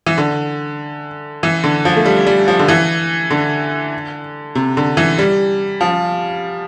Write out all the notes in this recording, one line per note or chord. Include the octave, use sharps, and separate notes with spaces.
E3
D3
E3
D3
F3
A3
G3
G3
F3
D3
E3
D3
C3
D3
E3
G3
F3